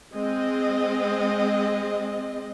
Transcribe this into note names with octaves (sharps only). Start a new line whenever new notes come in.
G#3 C4 D#5